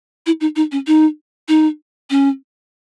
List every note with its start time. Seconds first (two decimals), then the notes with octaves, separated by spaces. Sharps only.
0.26 E4
0.41 D#4
0.56 D#4
0.72 C#4
0.87 D#4
1.48 D#4
2.10 C#4